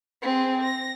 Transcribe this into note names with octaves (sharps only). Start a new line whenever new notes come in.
C4 G#4
A#6